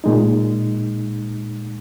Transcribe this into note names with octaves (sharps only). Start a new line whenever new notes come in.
A#2 G#3 D#4